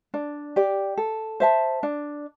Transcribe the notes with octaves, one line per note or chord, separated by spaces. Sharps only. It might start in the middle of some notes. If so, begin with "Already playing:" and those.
D4
G4 D5
A4
C5 E5 A5
D4